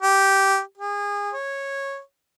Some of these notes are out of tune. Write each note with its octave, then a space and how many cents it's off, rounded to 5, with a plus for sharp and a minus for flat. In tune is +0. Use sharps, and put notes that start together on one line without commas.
G4 -10
G#4 -30
C#5 -10